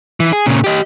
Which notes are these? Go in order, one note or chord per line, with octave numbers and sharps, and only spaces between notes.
E3
G#4
A#2 C#3
G4 D#5